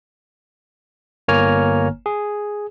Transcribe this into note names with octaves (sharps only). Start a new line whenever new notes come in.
G1 A#3 C#5 G#5 A#5 F6
G#4